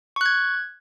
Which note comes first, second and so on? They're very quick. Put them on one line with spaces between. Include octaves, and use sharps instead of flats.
C#6 F#6 G#6